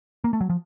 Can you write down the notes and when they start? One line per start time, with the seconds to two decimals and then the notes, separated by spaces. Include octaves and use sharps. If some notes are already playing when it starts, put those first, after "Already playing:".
0.24 A#3
0.33 A3
0.41 F#3
0.50 F3